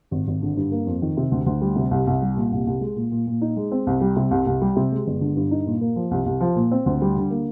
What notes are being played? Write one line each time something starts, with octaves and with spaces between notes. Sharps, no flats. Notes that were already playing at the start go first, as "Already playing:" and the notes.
G#1
G#1
D3
G2
A#3
F2
D#3
C3
D2
D2
G3
C3
C2
C2
G3
A#2
C2
C2
G#3
A#2
A#2
A#2
D#4
G#3
C4
C2
G3
C3
C2
C2
G3
C3
G#3
G1
D3
G2
D#4
A#2
A#3
F3
C2
C2
F3
A#2
C4
D2
G3
D3
A#3